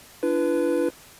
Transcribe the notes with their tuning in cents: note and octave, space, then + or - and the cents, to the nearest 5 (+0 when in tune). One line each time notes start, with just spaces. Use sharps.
D4 +0 F4 -45 B4 +0